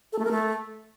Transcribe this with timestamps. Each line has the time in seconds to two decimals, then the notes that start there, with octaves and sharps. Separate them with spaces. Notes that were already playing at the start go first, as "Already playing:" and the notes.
0.13 A4
0.19 A3
0.25 A#4
0.31 A3